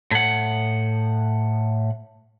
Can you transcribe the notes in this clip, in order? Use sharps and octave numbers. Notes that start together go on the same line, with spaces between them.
A2 F#5